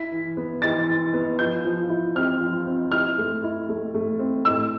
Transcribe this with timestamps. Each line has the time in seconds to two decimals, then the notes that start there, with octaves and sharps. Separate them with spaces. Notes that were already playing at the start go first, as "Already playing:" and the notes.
Already playing: E4 B6
0.12 E3
0.37 B3
0.62 E3 A6
0.88 E3
1.14 B3
1.39 F3 G6
1.65 F3
1.89 E4
2.15 C4 F6
2.41 F3
2.66 C4
2.92 E4 F6
3.18 A3
3.44 E4
3.69 A3
3.94 A3
4.19 C4
4.45 A2 E6